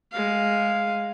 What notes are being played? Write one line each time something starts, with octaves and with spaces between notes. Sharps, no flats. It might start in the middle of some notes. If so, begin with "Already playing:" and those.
G#3 F5